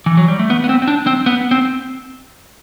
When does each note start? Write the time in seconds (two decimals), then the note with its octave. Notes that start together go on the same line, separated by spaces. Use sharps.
0.06 E3
0.17 F#3
0.28 G3
0.39 A3
0.50 B3
0.64 B3
0.69 C4
0.82 C4
0.88 D4
1.07 C4
1.26 B3
1.51 C4